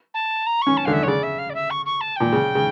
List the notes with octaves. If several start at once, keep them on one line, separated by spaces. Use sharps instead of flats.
A5
A#5
C#4 C#6
A5
D3 F5
E5
C#5
C#3 D5
E5
F5
D5
E5
C#6
C#6
A5
A#2 G5
C#3
C#3